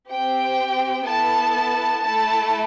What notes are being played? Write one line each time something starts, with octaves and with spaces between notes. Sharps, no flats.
C4 G4 G5
B3 E4 A4 A5
A3 E4 A4 A5